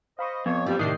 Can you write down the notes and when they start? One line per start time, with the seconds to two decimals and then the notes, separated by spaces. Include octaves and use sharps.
0.19 C5 D#5 F5 B5 C#6
0.46 F2 B3 C#5
0.66 F#2 A#2 G3 C4 G4
0.79 A2 C3 D#3 D4 D#6 G6 C7